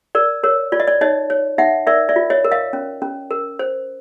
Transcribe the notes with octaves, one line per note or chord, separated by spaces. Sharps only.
A#4 D5
A#4 C#5
F4 D5
D#5
D5
D#4 C#5 D#5
C#5
D#4 E5 F#5
A#4 D5 E5
D5 E5
F4
C#5 D#5
A#4
D#5 F5
C#4
C#4
A#4
C5